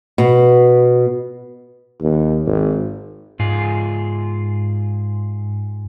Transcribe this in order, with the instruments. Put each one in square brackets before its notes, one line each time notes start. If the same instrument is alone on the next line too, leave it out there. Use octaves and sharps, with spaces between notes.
[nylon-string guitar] B2
[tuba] D#2
G#1
[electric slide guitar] G#2 F4 G#4